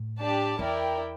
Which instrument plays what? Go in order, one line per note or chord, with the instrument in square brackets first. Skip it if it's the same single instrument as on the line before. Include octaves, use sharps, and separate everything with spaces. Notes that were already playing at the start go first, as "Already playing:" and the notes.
Already playing: [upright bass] A2
[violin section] D4 G4 D5 A5
[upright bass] E2 [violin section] E4 A#4 D5 G5